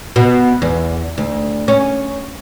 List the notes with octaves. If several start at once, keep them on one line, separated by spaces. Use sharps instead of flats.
B2
E2
D2
C#4